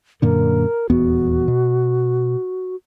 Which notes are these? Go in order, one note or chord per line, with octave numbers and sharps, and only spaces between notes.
F#2 A#2 D3 A#4
D#1 E2 B3 F#4
B2